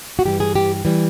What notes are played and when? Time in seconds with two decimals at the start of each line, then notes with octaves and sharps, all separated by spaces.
0.19 F#4
0.26 G2 E3 G3 G4
0.40 G#4
0.55 G4
0.85 E3 G3